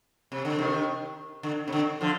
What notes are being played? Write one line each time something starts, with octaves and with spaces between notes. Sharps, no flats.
C3
D3
C3 D#3
D3
C3
D3
D3 F3